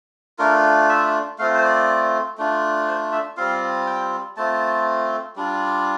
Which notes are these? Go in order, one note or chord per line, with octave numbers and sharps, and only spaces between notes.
A3 D4 F4 A#4
E5
A3 C4 F4 F5
C5
D5
A3 D4 F4
C5
E5
G3 C4 F4 F5
G5
A3 C4 F4 A5
G3 D4 F4